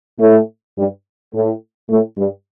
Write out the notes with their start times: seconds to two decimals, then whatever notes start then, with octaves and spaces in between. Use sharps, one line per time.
0.19 A2 A3
0.76 G2 G3
1.33 A2 A3
1.89 A2 A3
2.17 G2 G3